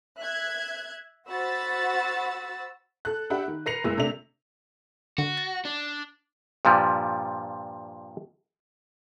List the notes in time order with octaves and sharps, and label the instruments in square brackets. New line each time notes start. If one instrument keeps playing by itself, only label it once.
[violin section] E5 F#6 G#6
F#4 C5 F#5 B5 E6 A6
[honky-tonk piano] A4 F#6
D4 G4 E5 F#5 B5
D#3
A#4 B4 A#6 C7 C#7 F7
F#1 G#3 E4 E6
C3 A3 D4 E5 F7
[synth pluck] D3 [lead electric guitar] F#4
[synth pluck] A6
[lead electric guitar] D4
[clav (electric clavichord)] G2 A#2 F3 G3